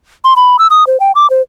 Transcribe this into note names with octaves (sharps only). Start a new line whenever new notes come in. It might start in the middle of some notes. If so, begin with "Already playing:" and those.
C6
B5
E6
D#6
C5
G5
D6
C5